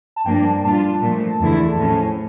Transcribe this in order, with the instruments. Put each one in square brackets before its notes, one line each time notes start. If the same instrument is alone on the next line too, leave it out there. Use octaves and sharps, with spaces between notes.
[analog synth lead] A5
[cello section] G2 F3 A#3 D4 [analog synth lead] G5
[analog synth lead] A5
[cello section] A#2 G3 D4 F4 [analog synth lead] A5
[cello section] A#2 F3 A3
E2 D3 A3 E4
A2 F3 C#4